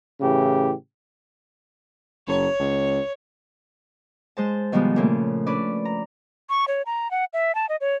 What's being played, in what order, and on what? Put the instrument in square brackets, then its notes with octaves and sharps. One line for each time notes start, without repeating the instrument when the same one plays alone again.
[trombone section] A2 C#3 E3 G4
[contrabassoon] F#1 [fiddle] C#5
[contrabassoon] C#2
[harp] G#3 C5 A5
B2 D#3 F3 G3 G#3 B3
A#2 C#3 A3
C#4 D4 B4 D5
A#5
[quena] C#6
C#5
A#5
F#5
E5
A5
D#5
C#5